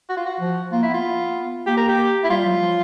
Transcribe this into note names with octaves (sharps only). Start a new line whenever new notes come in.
F#4
F4
F#4
F3
A#3 F4
E4
B3
F4
A#3 G4
A#4
G4
E4
G3 F4
F#3
F3